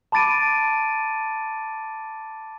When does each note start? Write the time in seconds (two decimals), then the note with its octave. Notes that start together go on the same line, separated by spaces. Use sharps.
0.12 A5 B5 D6 A6 D7 D#7